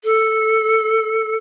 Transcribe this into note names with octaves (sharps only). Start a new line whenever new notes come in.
A4